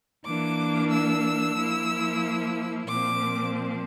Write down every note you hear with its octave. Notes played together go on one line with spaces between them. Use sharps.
E3 A#3 D4 D6
E6
F3 A#3 E4
A#2 F3 C4 D6